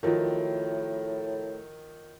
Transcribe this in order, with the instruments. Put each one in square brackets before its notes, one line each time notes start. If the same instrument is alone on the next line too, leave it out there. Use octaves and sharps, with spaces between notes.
[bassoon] A2 [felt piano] D#3 F3 F#3